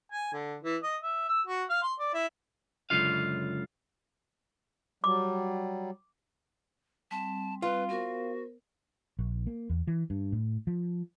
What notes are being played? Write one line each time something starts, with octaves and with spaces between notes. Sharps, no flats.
G#5
D3
E3
D#5
E5
E6
F#4
F5
C6
D5
E4
C#2 F#2 D3 F4 F5
F#3 G3 D6
G3 C4 A5
F4 B4
B3 F#4 A#4 C5
A#1
A#3
E2
E3
G2
A2
F3